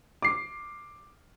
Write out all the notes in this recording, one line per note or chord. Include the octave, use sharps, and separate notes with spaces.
D6 C7